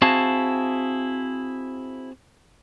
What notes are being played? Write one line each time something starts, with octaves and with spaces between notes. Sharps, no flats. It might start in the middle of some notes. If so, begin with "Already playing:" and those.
C4 E4 F#4 G#4 F5 A5